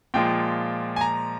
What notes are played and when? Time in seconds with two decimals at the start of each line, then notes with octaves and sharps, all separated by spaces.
0.14 A#2 F3 G#3 G5
0.96 G#5
1.01 A#5